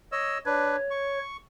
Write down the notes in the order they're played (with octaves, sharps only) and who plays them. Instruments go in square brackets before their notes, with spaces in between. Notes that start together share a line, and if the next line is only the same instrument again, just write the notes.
[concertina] C#5 D#5 E6
[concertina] D4 B4 [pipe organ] C#5
[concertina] C#6